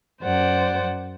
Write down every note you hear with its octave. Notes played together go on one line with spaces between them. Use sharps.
F#2 C5 D5 F#5